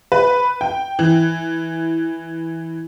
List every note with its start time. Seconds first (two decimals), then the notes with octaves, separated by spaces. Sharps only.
0.12 B4
0.61 G5
0.99 E3